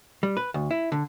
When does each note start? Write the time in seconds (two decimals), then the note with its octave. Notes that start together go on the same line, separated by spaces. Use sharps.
0.23 G3
0.37 B4
0.54 D2
0.71 E4
0.92 D3